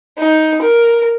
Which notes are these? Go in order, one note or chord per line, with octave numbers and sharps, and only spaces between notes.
D#4
A#4